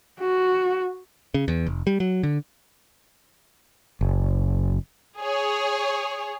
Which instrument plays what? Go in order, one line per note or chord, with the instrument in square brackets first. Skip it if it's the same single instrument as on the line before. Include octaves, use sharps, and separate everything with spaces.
[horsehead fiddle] F#4
[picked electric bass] C#3
E2
F1
G3
F#3
D3
[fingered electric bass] F#1
[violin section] G#4 C#5